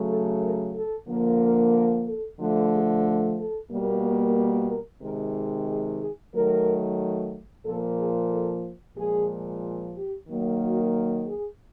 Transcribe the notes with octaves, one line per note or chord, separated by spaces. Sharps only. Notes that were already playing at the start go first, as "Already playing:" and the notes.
Already playing: C#3 F#3 A3
A4
A#4
A4
D3 F3 A#3
A#4
A#4
A4
D3 F3 A3
G#4
A4
A4
B2 G3 A#3
A#4
A#4
C3 D#3 G#3 A#4
G#4
G#4
D#3 F#3 A3 A#4
A#2 F3 A#3 A4
G#4
A4
A#2 F3 G#3 G#4
G4
D#3 F#3 A#3
F#4
G#4